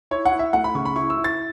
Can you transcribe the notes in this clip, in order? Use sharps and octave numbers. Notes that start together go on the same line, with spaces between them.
E4 C#5
F#5
E4
E5
A3 F#5
B5
C#3 C#6
B5
E4 C#6
E6
E4
A6